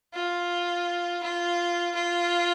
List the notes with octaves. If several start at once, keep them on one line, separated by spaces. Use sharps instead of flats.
F4
F4
F4